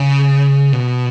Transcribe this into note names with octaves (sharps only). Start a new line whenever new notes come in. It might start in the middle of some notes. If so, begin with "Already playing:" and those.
Already playing: C#3
B2